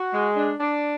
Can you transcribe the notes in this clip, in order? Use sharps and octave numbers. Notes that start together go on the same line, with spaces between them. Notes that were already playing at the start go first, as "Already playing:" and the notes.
Already playing: F#4
G#3
D4
D4